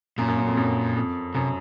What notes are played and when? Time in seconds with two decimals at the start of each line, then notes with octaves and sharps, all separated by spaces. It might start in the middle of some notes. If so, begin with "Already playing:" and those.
0.18 F#2 A#2
0.28 F#2
0.38 F#2
0.47 F2
0.57 F#2
0.96 F2
1.35 F#2 C3